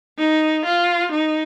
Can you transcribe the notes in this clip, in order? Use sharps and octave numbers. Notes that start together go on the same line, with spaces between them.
D#4
F4
D#4